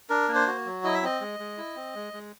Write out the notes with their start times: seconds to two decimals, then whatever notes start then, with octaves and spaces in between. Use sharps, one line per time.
0.10 D4 A#4
0.29 A#3
0.35 C5
0.47 F#4
0.66 F#3
0.84 E4 D#5
0.94 E5
1.03 C4 D#5
1.21 G#3
1.39 G#3
1.58 E4
1.76 C4
1.95 G#3
2.13 G#3